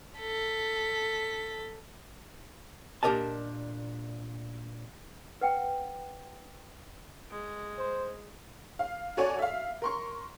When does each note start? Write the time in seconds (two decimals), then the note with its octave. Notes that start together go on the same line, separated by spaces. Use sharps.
0.19 A4 B6
3.03 A#2 D4 G4 A#4 D#5 A5
5.41 B4 F#5 G5
7.30 G#3
7.78 C5
8.79 F5
9.17 F#4 A4 C#5 D5 G#5 C#6
9.39 E5 F5
9.82 A#4 C6 C#6